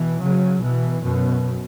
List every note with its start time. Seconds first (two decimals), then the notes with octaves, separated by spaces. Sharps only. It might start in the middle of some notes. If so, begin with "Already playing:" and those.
Already playing: B2 E3
0.22 C#3 F#3
0.63 B2 E3
1.04 F#2 B2